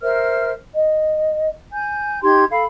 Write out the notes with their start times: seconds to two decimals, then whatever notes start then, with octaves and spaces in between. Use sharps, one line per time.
0.01 A#4 C5 E5 F6
0.74 D#5
1.72 G#5 G6
2.23 D#4 G4 C6 G#6
2.50 A4 F5 B5